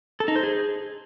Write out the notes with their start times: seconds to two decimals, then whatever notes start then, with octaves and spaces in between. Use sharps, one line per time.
0.20 A4
0.28 D#4
0.36 C5
0.43 G#4